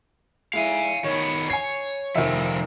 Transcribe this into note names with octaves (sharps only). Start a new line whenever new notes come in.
G#3 E4 F5 G#5
D#3 B3 C#5
C#5 G#5 C7
F1 D#3 F3 D#4 E5